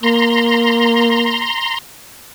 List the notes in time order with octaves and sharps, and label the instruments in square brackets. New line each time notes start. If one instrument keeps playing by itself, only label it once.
[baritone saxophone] A#3 [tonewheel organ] A#5 C6